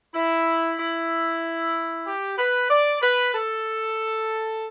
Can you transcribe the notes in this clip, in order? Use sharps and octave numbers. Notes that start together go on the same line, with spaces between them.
E4
E4
G4
B4
D5
B4
A4